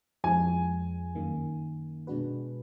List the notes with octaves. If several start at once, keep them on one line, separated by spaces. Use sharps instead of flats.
F2 F3 G#3 G#5
F#2 D#3 A#3
B2 G#3 D4 F#4 B4